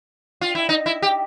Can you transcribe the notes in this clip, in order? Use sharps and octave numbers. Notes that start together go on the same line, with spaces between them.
F4
E4
D#4
E4
G4